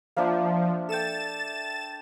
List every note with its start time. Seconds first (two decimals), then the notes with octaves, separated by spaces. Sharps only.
0.17 F3 A#3 D4 E5
0.89 A4 G5 A6 E7